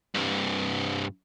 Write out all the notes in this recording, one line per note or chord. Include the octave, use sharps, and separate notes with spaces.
C2 G2